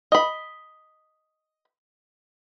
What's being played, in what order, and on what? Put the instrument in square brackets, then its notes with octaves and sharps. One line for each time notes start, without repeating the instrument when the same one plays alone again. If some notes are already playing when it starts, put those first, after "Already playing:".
[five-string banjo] D#5 B5